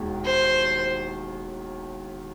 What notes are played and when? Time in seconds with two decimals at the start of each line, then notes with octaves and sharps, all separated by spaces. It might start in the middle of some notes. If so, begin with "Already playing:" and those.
Already playing: E1 D#2 D#3
0.25 C5